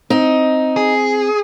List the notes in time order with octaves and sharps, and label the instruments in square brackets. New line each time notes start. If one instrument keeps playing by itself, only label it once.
[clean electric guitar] C4 [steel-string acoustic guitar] D#4
[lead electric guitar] G#4